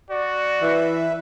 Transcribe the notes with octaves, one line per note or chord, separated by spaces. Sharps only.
F#4 D5
E3 B4 E5